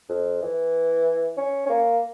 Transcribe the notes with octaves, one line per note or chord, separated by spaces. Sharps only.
F2
E3
C#4
C#4
A#3